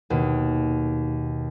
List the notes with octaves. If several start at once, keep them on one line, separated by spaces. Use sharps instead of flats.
D#2 B2